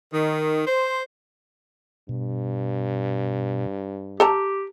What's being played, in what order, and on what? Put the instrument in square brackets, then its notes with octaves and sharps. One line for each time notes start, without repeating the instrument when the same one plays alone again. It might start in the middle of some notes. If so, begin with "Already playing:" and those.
[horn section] D#3
C5
[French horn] G2 [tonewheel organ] B2
[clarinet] G4 [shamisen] A4 A5 A#5